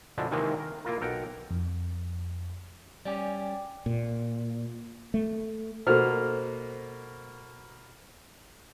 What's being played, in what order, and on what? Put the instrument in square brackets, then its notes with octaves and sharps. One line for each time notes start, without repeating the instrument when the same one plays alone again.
[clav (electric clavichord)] B2 D3 F3 G#3 D4 E4
C3 D#3 E3 G#3 A#3 C4
A#4
A#3 E4 F4 A#4
B1 A4 A#4 F#5 G5
[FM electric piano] F2
[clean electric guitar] G3 C#4 G4 [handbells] D5 G5 G#5
[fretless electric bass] A#2
A3
[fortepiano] B2 A#3 F6 [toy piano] F#4 A4 C5